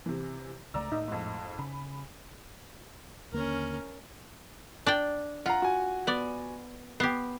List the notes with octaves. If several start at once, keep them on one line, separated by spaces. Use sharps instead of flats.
C3 E3
C#2 G3 A3 D5 A#5 E6
A2 D#4
F2 G#2
C#3 B5
D#2 D3 A#3 C#4 A#4
D4 D5 G5
F4 F#5 A#5
F#4 G#5
B3 D5
B3 G4 C7